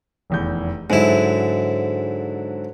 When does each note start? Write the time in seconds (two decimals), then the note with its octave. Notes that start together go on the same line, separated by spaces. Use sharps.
0.30 F1 E2 G6
0.90 G#2 D3 F#3 E4